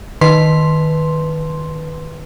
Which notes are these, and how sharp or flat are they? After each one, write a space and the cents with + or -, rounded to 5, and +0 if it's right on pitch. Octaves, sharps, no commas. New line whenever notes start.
D#3 +0 B4 +0 C6 +0